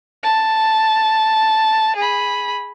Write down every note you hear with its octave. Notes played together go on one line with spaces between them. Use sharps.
A5
G#4 B5